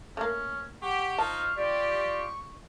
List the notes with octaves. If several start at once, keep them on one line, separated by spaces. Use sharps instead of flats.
A3 A#3 C#4
G4 F#5 C#6
D#4 F4 C5 A5 F6
F4 G4 D5